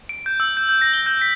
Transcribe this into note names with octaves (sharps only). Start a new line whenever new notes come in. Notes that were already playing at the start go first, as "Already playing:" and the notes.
D7
G6
E6
G6
G6
A#6
G7
G6
B6